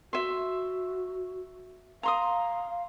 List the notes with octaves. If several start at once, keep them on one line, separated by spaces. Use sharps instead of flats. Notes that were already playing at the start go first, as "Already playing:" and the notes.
F#4 E5 C6
F5 A#5 C6 D#6